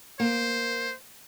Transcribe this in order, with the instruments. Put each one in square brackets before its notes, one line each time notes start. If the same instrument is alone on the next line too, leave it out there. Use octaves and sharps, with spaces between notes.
[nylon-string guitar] A#3 [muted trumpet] C5